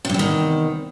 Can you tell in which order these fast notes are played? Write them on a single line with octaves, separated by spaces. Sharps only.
C3 G2 E2 D#3